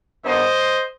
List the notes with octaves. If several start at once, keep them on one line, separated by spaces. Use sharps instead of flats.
G2 D#3 B3 D#4 C5 D#5